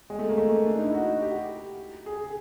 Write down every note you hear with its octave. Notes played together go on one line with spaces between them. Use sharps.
G#3
A3
A#3
A3
D4
D#4
E4
F#4
G4
G#4
G#4